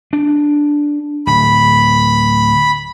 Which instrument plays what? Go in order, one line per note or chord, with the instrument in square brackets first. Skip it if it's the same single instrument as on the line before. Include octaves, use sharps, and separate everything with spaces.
[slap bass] D4
[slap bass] D1 [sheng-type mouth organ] B5